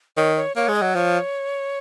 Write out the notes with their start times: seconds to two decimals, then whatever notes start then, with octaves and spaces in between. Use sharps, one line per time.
0.17 D#3 C#5
0.36 C#5
0.56 A#3 C#5
0.68 G#3
0.75 D#5
0.82 F#3
0.95 F3 C#5